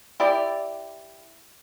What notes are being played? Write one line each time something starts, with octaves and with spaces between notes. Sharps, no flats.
E4 G4 D5